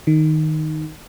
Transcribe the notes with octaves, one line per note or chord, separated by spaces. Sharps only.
D#3